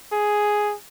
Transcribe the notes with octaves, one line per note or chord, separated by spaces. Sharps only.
G#4